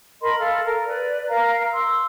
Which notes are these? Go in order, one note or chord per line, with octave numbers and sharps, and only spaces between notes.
A#4 D#5 B5 C6
A4 F5 F6
A#4
B4 D5
A#4 F5 A#5
C6 E6